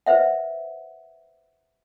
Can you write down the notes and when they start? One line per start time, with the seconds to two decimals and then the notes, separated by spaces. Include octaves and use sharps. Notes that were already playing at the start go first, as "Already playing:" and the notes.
0.06 B4 C5 E5 F#5